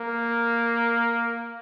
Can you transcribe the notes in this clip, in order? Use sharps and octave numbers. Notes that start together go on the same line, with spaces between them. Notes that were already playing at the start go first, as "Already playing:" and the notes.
Already playing: A#3